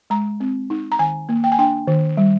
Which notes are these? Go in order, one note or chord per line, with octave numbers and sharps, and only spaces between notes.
G#3 A#5
C4
D#4
A#5
D#3 G#5
A#3
G5
G#5
D4 G5
D#3
G3